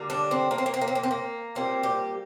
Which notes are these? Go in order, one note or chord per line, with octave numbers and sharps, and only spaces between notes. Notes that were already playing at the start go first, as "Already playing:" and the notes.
Already playing: D3 G3 A#3
D4
C4
A#3
C4
A#3
C4
A#3
C4
A#3
C4
A#3
A#2 G3 A#3 C4
G4